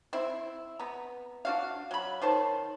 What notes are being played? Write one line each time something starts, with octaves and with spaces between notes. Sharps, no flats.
C4 E4
B3 A#5
D4 F#4 F5
F#3 B5
D#3 C5 C#5 A5